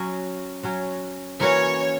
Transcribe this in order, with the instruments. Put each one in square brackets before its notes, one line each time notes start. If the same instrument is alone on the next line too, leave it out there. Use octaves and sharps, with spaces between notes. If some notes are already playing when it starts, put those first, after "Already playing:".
Already playing: [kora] F#3 C#4 F#4
F#3 C#4 F#4
[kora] E3 A#3 C#4 F#4 [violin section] C#5